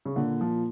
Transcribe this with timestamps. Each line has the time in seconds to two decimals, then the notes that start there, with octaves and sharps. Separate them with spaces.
0.06 C#3
0.16 A#2 D3
0.41 F3